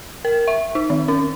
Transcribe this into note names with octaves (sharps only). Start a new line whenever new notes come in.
A#4
E5
D#4
D#3
C#4